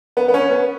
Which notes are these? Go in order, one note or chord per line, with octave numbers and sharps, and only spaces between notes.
B3
B3
C#4
B3